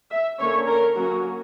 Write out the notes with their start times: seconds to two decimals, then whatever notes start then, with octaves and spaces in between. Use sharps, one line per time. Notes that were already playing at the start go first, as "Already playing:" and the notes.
0.11 E5
0.39 D3 A#3 C#4 C#5
0.67 A#4
0.95 F#3 A#3 C#4 F#4